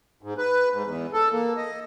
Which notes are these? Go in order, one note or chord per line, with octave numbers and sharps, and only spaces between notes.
G#2
B4
G#2
E2
A4
A#3
D#5